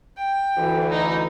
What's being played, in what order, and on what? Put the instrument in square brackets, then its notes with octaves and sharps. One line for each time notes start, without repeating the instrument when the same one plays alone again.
[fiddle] G5
[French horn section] D2 E3
[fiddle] D#4